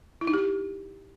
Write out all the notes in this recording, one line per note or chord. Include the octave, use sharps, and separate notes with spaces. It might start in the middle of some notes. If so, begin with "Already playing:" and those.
E4
D#4
G4